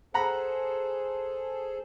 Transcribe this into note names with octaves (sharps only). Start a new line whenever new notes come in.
G#4 A4 C5 F#5 A#5 B5